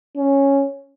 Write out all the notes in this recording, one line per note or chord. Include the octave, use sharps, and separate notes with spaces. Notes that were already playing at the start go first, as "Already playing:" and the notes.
C#4